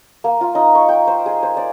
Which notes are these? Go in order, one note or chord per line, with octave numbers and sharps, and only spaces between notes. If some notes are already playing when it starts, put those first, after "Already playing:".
A#3
F4
D#4
C#6
G5
C5
G#4
C5
D5